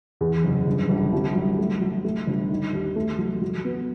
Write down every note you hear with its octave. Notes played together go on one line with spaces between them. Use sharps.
E2
F#1
G1
G1
C2
F#3
A3
F#3
A3
G1
D#3
D#2
A3
F#3
F#3
B3